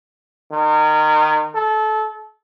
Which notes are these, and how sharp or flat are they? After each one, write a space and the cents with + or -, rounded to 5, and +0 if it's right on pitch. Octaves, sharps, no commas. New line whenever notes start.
D#3 -25
A4 -25